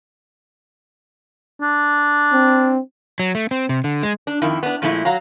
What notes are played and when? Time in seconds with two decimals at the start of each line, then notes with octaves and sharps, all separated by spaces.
1.61 D4
2.33 C4
3.20 F#3
3.35 A3
3.51 C4
3.69 C3
3.84 D3
4.03 G#3
4.27 D4
4.42 F2 D#3 E4
4.63 B3 D4
4.82 A#2 F3 G#3 A3 E4
5.05 F#3 F5 A#5